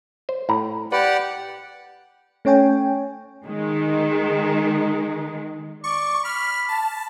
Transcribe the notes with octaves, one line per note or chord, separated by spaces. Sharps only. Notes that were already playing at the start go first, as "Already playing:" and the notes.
C5
A2 A#5
G4 B4 D5 F#5
A3 C#4 C#5 G5 G#5
D#3 G#3
D5 C#6
B5 F6
A5